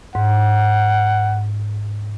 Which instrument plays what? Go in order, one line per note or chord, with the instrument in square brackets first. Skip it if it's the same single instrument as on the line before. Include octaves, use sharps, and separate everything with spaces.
[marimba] G#2 [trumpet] F#5